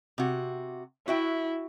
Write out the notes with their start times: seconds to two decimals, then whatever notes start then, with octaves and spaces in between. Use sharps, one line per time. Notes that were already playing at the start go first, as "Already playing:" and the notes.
0.18 C3 F#4
1.08 E4 F#4 E5 G5